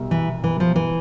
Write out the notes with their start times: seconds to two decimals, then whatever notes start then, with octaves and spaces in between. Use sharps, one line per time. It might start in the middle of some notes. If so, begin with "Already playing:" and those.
Already playing: C2 B2
0.11 E3
0.44 E3
0.60 F3
0.76 E3